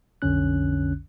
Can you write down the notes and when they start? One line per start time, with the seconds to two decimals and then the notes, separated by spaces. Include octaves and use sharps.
0.22 B1 F2 D3 C#4 F#6